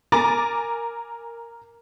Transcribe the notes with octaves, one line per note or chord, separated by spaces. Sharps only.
A#4 G#5 A#5 D6 A6